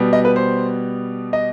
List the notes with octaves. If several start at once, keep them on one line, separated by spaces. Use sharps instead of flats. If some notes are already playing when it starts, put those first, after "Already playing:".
Already playing: B2 G3 B3
D#5
B4
C5
D#5